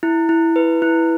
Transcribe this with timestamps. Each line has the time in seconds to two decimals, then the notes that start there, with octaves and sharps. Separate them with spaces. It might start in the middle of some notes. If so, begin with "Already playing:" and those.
0.03 E4
0.29 E4
0.56 B4
0.82 E4